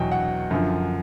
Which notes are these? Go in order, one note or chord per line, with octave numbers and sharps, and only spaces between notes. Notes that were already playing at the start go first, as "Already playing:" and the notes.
Already playing: E2 B2 F#3 G5
F#5
F#2 D3 F3